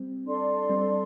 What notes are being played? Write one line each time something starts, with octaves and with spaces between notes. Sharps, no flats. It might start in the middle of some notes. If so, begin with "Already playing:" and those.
Already playing: G3 C4
D4 A4 D5 C6
G3 C4